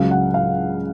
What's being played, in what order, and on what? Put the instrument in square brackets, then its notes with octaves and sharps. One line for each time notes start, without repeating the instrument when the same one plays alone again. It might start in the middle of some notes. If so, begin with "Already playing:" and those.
Already playing: [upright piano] C#2 C#3 F#3 F5
F#5
F5